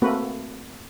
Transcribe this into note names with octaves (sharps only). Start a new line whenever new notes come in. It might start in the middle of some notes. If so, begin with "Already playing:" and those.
A3 A#3 C4 F#4 B4